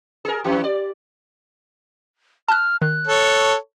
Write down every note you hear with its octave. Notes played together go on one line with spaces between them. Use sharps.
G#4 A#4
F2 E3 G4
D5
A5 F6 F#6
D#3 F#6
A4 C#5